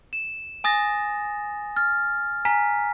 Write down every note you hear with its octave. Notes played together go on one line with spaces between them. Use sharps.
E7
G#5 D#6 A6 A#6
F6 A6
G#5 A#5 B6